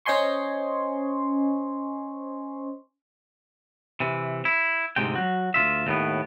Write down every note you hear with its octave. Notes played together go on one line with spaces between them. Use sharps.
C#4 C5 D#5 G#5 C6 C#6
C3 E3
E4
D2 G#2 C3 G#3 G5
F#3 F#4
D2 D#3 F4 E5
D#2 A2 B3